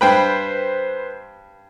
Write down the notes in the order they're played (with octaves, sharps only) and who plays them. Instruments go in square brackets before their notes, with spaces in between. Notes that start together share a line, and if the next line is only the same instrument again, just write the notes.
[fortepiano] G2 G5 B5 [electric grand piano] B4 C5